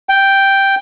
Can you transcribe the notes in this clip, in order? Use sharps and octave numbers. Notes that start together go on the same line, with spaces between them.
G5